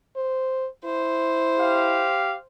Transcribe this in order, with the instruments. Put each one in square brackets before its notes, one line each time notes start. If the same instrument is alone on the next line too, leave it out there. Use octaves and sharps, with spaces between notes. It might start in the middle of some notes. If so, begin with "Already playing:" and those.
[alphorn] C5
[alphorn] E4 [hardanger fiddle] C5
[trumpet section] G4 F5